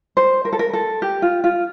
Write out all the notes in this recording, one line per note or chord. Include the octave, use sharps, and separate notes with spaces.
C5
A#4
A4
A#4
A4
G4
F4
F4